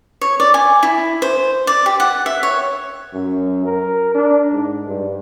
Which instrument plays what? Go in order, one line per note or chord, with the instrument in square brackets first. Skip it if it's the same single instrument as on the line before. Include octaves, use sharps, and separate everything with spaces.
[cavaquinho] C#5
D5
G#5
E4
C5
D5
G4
F#5
E5
C#5
[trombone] F#2
A#4
D4
G#2
G2